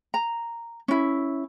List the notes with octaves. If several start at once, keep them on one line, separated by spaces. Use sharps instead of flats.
A#5
C#4 E4